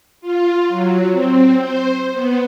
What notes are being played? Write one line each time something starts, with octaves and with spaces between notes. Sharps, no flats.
F4
F#3
C4
C5
B3